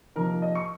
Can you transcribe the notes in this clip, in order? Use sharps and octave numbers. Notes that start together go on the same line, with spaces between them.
C3 F3 A#3 D#4 A#4
D#5
C#6